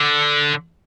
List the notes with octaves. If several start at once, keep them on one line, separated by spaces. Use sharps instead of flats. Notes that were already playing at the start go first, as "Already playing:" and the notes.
Already playing: D3